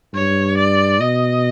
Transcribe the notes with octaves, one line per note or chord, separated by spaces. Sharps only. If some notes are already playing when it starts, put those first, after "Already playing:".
G2 C#5
D5
B2 D#5